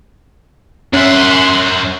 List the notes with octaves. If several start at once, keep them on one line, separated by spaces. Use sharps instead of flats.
F#2 C#4 E5 F#5 C6